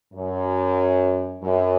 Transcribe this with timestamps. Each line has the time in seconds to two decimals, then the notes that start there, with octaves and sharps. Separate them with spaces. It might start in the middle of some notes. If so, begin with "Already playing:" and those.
0.13 F#2
1.42 F#2